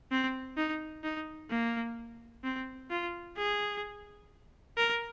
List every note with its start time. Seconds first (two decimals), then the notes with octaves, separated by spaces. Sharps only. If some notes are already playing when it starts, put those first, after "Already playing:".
0.11 C4
0.57 D#4
1.04 D#4
1.50 A#3
2.44 C4
2.91 F4
3.37 G#4
4.77 A#4